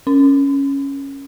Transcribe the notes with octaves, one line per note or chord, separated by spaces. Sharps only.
C#4